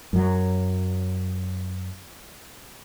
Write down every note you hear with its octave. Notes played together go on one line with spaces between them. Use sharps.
F#2 F#3